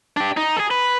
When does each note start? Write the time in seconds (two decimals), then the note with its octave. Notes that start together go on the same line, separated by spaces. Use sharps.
0.17 D4 G4
0.37 D#4
0.57 G#4 A4
0.71 B4